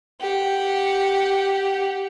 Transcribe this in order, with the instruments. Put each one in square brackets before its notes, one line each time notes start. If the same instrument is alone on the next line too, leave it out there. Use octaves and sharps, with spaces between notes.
[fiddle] G4 F#5